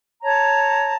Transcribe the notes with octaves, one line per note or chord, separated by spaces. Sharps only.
C#5 A5 A#5